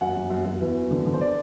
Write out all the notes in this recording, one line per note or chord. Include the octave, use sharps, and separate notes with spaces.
F#2 F#5
F#2
F#2
F#2
E2
F#3
D3
D3
C5
D5